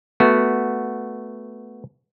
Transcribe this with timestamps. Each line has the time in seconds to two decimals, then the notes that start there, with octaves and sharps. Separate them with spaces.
0.20 A3 B3 F#4